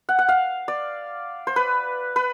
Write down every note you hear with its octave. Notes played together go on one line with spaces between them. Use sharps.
F#5
F#5
F5
D5
C5
B4
B4